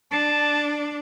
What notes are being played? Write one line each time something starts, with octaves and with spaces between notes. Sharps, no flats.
D4 A5